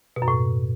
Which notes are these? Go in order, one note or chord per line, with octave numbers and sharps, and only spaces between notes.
B2
F#2
A2